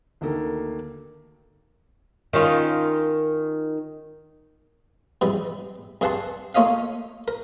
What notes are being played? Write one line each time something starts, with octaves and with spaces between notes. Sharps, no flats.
D2 D#3 A#3 A4
D#3 C#4 F4
G#2 C3 E3 G3
C2 G2 G#4 F#5 A5 C6
A3 A#3 F4 C#5 D#5 F5
A#4